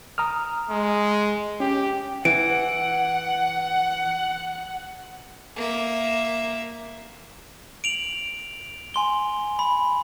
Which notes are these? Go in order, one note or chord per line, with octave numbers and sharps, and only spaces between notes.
A#5 D#6 F6
G#3
C#4 G4
E3 F#5 D7
A#3 E5
D7 F7 F#7
G#5 C6 G7
B5